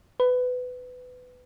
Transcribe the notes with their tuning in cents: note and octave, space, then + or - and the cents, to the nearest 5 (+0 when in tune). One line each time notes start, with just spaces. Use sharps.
B4 +20